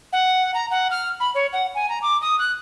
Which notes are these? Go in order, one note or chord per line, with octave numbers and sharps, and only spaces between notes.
F#5
A#5
F#5
F6
B5
C#5
F#5
G#5
A#5
D6
D#6
F#6